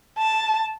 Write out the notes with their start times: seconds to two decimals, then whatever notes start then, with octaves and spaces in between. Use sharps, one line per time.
0.18 A5